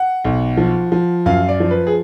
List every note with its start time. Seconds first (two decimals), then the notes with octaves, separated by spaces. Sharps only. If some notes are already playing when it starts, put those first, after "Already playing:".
Already playing: F#5
0.24 B1
0.57 F3
0.92 F3
1.26 F#2 F5
1.48 D5
1.60 F3
1.71 B4
1.87 G#4